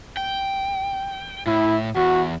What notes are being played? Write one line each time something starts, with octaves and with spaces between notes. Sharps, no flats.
G5
A2 E4
E2 F#4